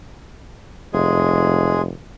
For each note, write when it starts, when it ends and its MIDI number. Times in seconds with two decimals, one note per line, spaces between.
0.93 1.91 29
0.93 1.82 56
0.93 1.82 68